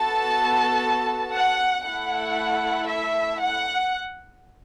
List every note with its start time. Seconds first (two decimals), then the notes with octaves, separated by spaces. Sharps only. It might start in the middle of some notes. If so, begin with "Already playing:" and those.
Already playing: B3 F#4 A4 A5
1.33 F#5
1.84 A3 E4 A4 F#5
2.87 E5
3.38 F#5